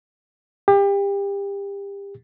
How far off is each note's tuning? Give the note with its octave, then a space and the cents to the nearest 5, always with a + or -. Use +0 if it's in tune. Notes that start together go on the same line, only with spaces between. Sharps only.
G4 +30